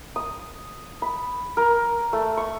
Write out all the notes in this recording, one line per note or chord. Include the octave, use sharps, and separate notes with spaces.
D#6
B5
A#4
A3
C#6